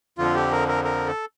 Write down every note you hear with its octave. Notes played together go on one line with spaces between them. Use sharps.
F2 D3 F3 F4
G4
A#4
A#4
A#4
A4